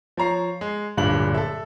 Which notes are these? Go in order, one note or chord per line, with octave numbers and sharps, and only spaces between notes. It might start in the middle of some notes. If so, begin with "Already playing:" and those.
F3 C#5 A#5 C7
G#3
D1 G2 A#2 D4 F#7
A4 E5